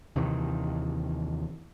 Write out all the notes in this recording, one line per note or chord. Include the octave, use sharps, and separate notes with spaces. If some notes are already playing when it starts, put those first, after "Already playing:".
D#2 C3 D#3 E3